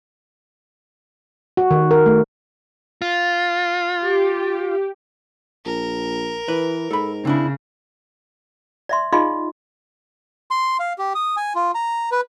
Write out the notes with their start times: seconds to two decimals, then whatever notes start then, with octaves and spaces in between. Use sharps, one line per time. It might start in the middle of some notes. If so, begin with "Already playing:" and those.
1.57 F#4
1.71 D#3
1.91 A#4
2.06 A3
3.02 F4
4.03 G4
5.66 A#1 A#4
6.48 E3 B4
6.91 G#2 A4 B5
7.25 C#3 C4 D4 E4
8.89 D5 E5 C6
9.13 D#4 F4 G#4 D#5 F5 C6
10.51 C6
10.79 F5
10.98 G4
11.15 D#6
11.37 G#5
11.55 F4
11.75 A#5
12.12 B4